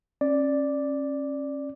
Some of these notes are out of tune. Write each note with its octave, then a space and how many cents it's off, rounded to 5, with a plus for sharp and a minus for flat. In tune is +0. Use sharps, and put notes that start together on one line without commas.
C#4 -30 D5 +0